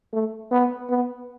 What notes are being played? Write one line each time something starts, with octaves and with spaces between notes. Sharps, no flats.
A3
B3
B3